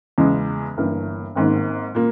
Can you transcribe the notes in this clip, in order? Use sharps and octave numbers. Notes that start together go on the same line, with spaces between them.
E2 C#3 G#3
G1 G2 E3 A#3
G#1 G#2 D#3 A#3
A#2 A#3